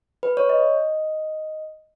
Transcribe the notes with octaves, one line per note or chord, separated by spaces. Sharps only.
B4
C#5
D#5